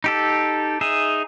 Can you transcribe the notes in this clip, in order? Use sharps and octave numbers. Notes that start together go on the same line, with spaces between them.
D#4 G4 A4
D#4 G#4 E5